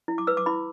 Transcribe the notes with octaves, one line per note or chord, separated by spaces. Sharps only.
E4
D6
B4 E6
D6
E4 B5